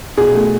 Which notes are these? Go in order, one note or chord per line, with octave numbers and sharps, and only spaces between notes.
B2 G#4
A3